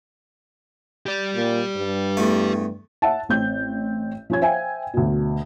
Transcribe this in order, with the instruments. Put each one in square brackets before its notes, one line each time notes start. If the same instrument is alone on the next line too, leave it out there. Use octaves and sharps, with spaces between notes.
[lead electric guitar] G4 D5
[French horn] A#2
G2
[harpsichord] E2 A3
[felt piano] E5 F#5 A5
A1 C4 G6
F3 C#4 G#6
C5 E5 F5 G5 G#5
D2 B2